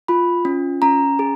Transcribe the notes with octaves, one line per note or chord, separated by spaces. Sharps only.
F4 B5
C#4
C#4 A#5
G#4